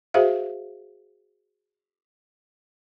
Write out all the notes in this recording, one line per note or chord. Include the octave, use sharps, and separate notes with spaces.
F#4 G#4 C5 E5 F5